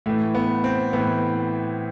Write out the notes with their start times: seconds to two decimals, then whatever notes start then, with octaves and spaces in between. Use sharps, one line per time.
0.06 A2 E3 A3
0.35 B3
0.64 C4
0.93 A2 E3 B3